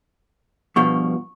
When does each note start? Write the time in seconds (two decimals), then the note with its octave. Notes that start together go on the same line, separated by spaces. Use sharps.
0.76 G2 B2 F3 C#6